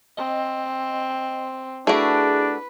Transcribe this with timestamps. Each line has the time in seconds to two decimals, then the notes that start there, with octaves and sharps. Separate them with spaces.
0.17 C4 D#5
1.87 A3 D4 E4 F#4 G#4 B4 D7